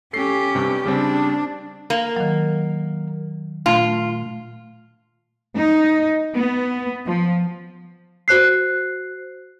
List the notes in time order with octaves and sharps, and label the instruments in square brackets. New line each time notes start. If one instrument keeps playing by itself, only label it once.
[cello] C#4 G4 [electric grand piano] A4 C7
[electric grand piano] G2 C3
[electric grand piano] C#3 G3 C4 [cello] D4
[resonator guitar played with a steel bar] A#3
[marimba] D#3 F#3
[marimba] A#2 A3 [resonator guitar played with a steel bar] F4
[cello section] D#4
B3
F3
[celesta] F#4 C5 F#6 C7